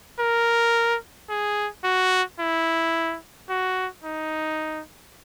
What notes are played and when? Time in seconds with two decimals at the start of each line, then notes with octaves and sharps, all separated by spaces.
0.19 A#4
1.29 G#4
1.84 F#4
2.39 E4
3.49 F#4
4.04 D#4